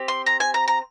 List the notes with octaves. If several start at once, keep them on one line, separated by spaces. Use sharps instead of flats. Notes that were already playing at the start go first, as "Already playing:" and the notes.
Already playing: C4 G4
C6
A#5
G#5
A#5
A#5